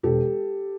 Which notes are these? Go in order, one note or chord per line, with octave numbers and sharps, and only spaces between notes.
E1 G4 A4